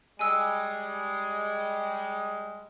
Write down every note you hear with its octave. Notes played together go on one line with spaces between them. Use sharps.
G3 G#3 G#5 E6